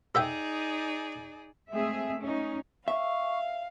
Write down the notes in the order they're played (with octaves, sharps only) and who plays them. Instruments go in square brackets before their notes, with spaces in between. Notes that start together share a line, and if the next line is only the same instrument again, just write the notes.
[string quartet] D#4 G#4 D5 [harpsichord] A4 E5 G5
[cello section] G#3 A3 C4 G#4 E5
C#4 D#4
[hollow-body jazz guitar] E5 [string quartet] F5 [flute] C#6